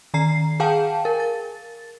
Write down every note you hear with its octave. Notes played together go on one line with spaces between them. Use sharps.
D#3 A#5 C7
G#4 F5 G5 A5
A#4
A6